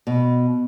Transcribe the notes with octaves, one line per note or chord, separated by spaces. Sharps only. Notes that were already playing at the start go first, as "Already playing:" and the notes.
B2